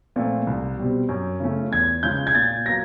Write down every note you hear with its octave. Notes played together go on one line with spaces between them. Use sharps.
A#2 F3 A3 C4
C2
B2 G3 C4
F#2
C#3 F3 A3 C#4
E2 G#6
C#3 F3 G#3 G6
G#6
A#2 A6
F#3 A#3 A#6